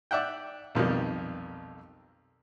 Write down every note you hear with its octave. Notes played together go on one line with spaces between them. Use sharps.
D5 E5 F#5 G5
B1 F2 D#3 G3